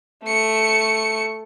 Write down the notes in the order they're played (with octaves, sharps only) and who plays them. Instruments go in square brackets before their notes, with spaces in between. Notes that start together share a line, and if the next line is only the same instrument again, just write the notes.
[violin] A3 C#7